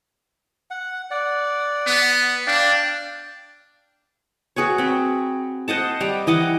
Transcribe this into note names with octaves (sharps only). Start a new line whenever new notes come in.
F#5
D5 F#5
B3
D4 D5 F5 G5
F#4 G#4 B4 C#5
C4 B5
C5 D#5 F#5 A5
G3 G4 A#5
E3 D#5 F#5 D6